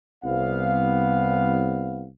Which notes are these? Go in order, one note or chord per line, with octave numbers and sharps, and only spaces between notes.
C2 B3 F5